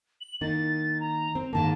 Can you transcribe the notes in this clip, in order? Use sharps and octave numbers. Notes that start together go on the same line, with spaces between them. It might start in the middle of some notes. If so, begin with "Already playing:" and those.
F#7
D#3 A#3 D#4 A6
A#5
C4
G#2 D#3 A#3 A5